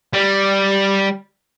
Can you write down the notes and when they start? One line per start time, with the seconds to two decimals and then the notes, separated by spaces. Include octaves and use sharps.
0.13 G3